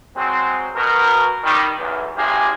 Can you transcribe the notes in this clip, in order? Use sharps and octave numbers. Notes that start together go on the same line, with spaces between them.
F#3 G#3 C4
B2 A#4
D#3 G3
B1 E2
G#1 C3 A#3 G4 G#4